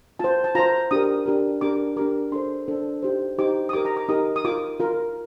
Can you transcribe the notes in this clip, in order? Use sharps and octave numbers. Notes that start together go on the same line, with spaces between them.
F4 C5 A5
A5
F4 C5 A#5
D4 G4 A#4 D#6
D4 G4 A#4
D4 G4 A#4 D6
D4 G4 A#4 D6
D4 A4 C5 C6
D4 A4 C5
D#4 G4 C5
D#4 G4 C5 D6
D#6
D#4 G4 A#4 D6
A#5
D6
D#4 G4 A#4 D#6
D#6
F4 A#4 D6
F4 A#4